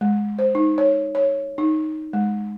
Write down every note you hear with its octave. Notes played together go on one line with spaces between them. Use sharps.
G#3
C5
D#4
C#5
C#5
D#4
G#3